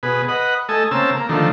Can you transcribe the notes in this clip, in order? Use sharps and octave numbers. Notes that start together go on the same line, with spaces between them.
B2 G#4 B4
B4 D#5 F#5
A3 A4 D#5 G#5
C#3 A#3 C4 A5 E6
A#3
D3 D#3 F3 A3